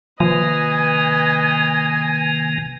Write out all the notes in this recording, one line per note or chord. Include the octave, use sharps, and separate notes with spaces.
C3 D#3 F3 A#3 B4 D#5 G#5